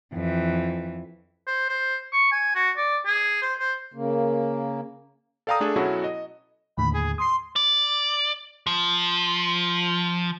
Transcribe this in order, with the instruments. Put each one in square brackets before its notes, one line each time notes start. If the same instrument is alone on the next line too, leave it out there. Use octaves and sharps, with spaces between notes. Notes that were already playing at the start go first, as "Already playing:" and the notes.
[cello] F2 E3
[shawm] C5
C5
C#6
G#5
F#4
D5
G#4
C5
C5
[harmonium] C#3 A#3
[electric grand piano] A4 D5 F5 G5 A#5 D#6
A3 D4 G#4 A4
B2 F#3 C#4 E4 F#4 A4
D#5
[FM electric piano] D#2 A2 D3 [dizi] B5
[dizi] G#4
[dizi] C6 [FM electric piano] D#6 C7
[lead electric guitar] D5
F3